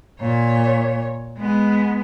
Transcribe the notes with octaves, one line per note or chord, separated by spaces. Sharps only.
A#2 C#5
G#3 B3